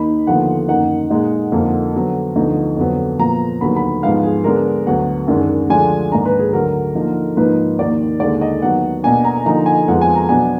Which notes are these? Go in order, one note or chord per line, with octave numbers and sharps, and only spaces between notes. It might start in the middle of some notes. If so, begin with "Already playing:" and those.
Already playing: D#2 D#3 A#3 D#4 B5
D#2 D3 F3 B3 F#5
F#2 D#3 A#3 D#4 F#5
A#2 G#3 D#4
F2 D3 F3 A#3 D#4
D3 F#3 B3
D2 D3 F3 B3 D#4
F2 D3 F#3 B3
A#2 F3 B3 A#5
D#2 D3 F#3 B3 B5
B5
G#2 F3 G#3 B3 F5
G#4
D3 G#3 B3 D4 A#4
D2 D3 F#3 B3 F#5
F#2 D#3 G#3 D4
D2 D3 F3 G#3 D4 G#5
G#2 D#3 A#3 D4 A#5
B4
G#4
D2 D3 F#3 A#4
D3 F3 A#3 D#4
G#2 F3 A#3 D#4 B4
D#2 D#3 A#3 D5
D#2 D3 G#3 D5
D#5
D#2 D#3 F#3 B3 F#5
B2 A#3 D4 G#5
A#5
D3 F3 A#3 D#4 A#5
G#5
F2 F3 G#3 B3 F#5
G#5
A#5
B2 F#3 B3 D4 G#5